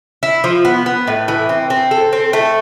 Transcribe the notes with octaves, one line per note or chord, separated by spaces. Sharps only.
E4
F3
B3
B3
A2
E3
C4
C4
A4
C4
A3